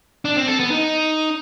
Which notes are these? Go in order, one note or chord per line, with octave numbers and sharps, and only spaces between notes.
D4
C4
A4
B3
D#4